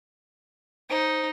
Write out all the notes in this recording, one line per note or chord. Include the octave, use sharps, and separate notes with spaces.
D#4 C5